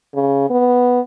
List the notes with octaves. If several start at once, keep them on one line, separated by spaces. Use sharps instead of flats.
C#3
B3